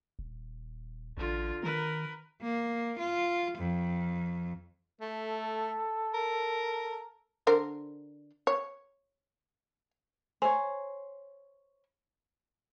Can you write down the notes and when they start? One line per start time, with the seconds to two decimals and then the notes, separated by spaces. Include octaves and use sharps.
0.19 D#1
1.17 A1 D3 F4
1.63 D#3 A#4 B4
2.41 A#3
2.98 F4
3.58 F2
5.01 A3 A4
6.14 A#4
7.47 D3 A#4 C5
8.47 C#5
10.42 C5 C#5 G#5